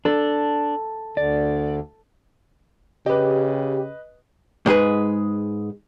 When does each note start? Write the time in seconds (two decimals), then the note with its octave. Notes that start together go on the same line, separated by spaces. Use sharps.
0.05 D4 A4
1.17 D2 D3 D5
3.06 C#3 G4 B4 D#5
4.66 G#2 G#3 G#4 B4